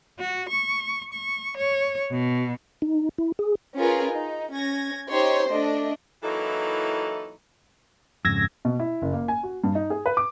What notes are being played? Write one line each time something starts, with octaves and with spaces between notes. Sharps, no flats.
F#4
C#6
C#6
C#5
B2
D#4
E4
G#4
C#4 F4 G#4 A#4 B4
D#4
C#4 G#6 A#6
D#4 G4 C5 C#5 C6
A3 D4 D#5
E3 F#3 A#3 D#4 E4 A4
F2 G#2 C#3 E6 G#6 A#6
B2
E4
F#1
A#3
G#5
F#4
G2
D#4
G#4
B4
D6